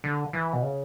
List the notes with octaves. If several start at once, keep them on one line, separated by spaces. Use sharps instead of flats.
D3
E3
B2
C#3